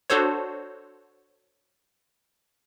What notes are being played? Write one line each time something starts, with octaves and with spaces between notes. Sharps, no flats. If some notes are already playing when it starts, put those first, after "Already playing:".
D4 F#4 A4 C5 C#5